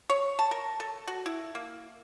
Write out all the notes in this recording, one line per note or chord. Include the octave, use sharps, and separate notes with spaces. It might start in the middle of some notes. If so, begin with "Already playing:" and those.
C#5
A5
A#4
A4
F#4
E4
A#3